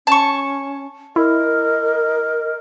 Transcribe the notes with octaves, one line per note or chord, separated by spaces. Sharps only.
C#4 A5 C#6
E4 A#4 D#5